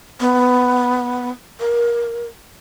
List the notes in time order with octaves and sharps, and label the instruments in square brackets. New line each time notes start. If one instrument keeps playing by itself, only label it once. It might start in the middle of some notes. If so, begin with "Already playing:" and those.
[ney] B3
A#4